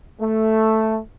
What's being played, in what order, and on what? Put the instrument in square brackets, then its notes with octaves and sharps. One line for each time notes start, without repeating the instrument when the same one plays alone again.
[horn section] A3